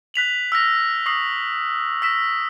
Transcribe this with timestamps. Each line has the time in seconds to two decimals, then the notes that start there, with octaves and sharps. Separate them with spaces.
0.14 F#6 B6 F7 F#7
0.52 E6 F6 A#6 F7
1.06 C#6 D#6 A#6 C7 F#7
2.02 E6 A#6 B6 E7